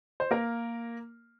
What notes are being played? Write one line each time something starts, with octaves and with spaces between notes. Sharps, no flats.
C5
A#3 A#4